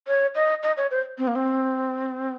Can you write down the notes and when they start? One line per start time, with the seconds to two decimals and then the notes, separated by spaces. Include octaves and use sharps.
0.08 C#5
0.35 D#5
0.63 D#5
0.77 C#5
0.91 C5
1.18 C4
1.27 A#3
1.36 C4